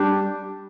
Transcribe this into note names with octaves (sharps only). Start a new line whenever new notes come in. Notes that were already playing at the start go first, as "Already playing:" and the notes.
Already playing: G3 D4